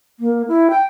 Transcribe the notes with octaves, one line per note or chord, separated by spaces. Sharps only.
A#3
E4
G5